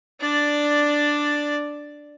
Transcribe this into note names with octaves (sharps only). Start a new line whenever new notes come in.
D4 D5